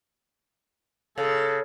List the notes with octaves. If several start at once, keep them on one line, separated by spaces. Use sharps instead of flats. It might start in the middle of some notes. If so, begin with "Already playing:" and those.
C#3 A4